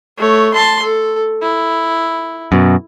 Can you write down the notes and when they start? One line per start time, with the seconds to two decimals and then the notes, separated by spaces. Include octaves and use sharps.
0.17 A3 C#5
0.54 A5 C6
0.83 A4
1.42 E4
2.52 F#2 B2